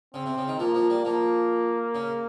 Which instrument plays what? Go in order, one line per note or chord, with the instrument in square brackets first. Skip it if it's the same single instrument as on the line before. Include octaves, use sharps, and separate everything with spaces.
[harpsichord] C#3 [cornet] C4
[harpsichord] C3
C#3
D#3
[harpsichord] F3 [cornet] A#3
[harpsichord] F3
G3
[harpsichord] F3 [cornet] A#3
[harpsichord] C#3